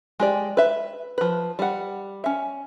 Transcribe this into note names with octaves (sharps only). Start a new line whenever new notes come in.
G#3 G4 D5
B4 E5
F3 B4
G3 F#5
C#4 E5